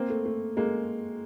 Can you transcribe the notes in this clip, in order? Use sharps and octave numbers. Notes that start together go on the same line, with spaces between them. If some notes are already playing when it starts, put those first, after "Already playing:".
Already playing: A#3 C4
A3
A3
G#3 A#3